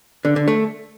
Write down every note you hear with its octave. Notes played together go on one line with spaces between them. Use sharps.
D3
D3
A3